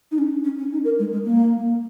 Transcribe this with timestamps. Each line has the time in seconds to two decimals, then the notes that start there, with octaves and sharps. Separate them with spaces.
0.12 D#4
0.18 C#4
0.44 C#4
0.59 C#4
0.72 D#4
0.85 A#4
0.99 G#3
1.13 G#3
1.25 A#3